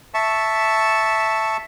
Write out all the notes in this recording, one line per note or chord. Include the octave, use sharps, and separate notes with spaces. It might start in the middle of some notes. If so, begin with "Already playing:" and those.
E5 A5 C#6